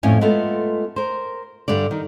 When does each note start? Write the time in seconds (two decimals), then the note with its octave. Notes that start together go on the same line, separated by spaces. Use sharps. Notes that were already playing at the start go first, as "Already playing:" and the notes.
0.03 F2 A2 C#4 G#5
0.21 G#3 A3 B3 F4 A4
0.96 A#4 C5
1.68 G2 D3 G3 D5
1.91 D#3